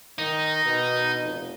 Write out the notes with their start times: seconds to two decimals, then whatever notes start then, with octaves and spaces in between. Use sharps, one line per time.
0.19 D#3 D#4
0.65 B2
1.21 F1